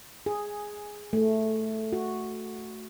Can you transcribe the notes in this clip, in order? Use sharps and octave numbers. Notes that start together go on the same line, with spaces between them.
G#4
A3
F#4